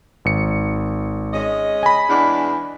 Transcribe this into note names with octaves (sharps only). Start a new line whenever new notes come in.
G#1 C#7
G#3 C#4 D#5
G#5 B5
E2 G#3 D4